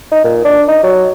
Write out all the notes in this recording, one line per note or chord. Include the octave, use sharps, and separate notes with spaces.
D#4
A#2
D4
D#4
F#3